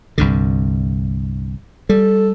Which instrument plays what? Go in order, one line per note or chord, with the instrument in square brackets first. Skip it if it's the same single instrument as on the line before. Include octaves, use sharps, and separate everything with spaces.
[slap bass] C2 G2 D3
[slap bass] G3 [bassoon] A4